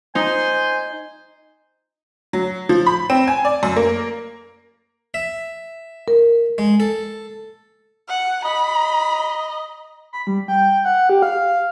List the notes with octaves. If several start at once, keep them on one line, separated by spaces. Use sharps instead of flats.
D#4 C5 G#5
F#3
F3
B5
C4
G#5
D5
F#2
A#3
E5
A#4
G#3
A4
F#5
D#5 B5
B5
G3
G5
F#5
G4
F5